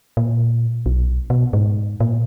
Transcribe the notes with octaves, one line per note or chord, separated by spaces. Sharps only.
A#2
B1
B2
G#2
A#2